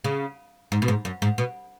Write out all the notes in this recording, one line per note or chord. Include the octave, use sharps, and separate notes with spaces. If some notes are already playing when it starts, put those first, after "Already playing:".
C#3
G#2
B2
G#2
F#2
G#2
B2